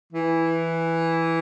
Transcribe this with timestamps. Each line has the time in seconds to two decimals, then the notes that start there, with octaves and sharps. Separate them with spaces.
0.13 E3